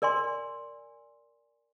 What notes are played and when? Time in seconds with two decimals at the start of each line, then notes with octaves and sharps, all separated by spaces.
0.02 A#4 D5 G#5 C6